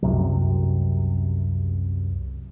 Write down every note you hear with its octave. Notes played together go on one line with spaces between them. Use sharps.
C2 F#2 C3 F#3